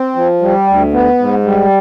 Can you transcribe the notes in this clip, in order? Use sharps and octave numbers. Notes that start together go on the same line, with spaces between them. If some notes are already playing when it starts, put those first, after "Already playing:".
Already playing: C4
F3
G3
D2
B3
G#2
G3